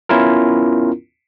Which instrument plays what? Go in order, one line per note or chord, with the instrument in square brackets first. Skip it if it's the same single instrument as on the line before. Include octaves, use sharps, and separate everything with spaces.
[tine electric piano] B3 C#4 E4 F4 A#4